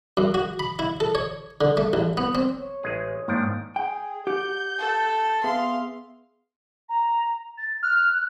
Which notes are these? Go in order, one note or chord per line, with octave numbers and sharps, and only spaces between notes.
F#2
F#4
B5
E4
A4
C#5
D3
A3
A1
B3
C4
C#5
A1 G#3 G#4
G#2 D#3 F3 A#3 D4 D#6 D7
G#4 G5
G4 F#5 G6
A4
B3 G#4 E5 F5 C6
A#5
A6
F6 F#6